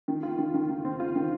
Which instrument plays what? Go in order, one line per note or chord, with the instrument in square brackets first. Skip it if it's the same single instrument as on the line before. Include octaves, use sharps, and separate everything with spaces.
[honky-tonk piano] D#3
F4
D#3
D#3
D#3
C4
F4
D#3